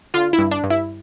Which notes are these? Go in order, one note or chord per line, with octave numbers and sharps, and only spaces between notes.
D3 F4
E4
G2
D4
G2
E4